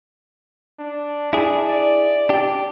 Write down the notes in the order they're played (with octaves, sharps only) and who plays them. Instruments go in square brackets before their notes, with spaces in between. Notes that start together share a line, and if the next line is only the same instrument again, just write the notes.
[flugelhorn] D4
[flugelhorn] D4 [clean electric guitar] E4 G#4
[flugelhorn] D5
[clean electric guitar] D4 G4